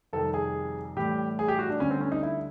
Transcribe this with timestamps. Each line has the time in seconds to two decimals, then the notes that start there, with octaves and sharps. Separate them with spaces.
0.13 F2 C3 D#3 G3 A4
0.34 G#4
0.96 A2 E3 G3 G4
1.39 G#4
1.48 G4
1.59 F#4
1.70 D4
1.80 D2 D3 G3 C#4
1.90 C4
2.01 C#4
2.12 D#4
2.23 E4